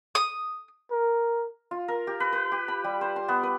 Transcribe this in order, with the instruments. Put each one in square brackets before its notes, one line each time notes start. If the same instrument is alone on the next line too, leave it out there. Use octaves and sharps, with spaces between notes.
[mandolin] D#6
[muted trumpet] A#4
[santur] F4
A#4
G4
B4
B4
G4
B5
G3
C5
C6
B3
B4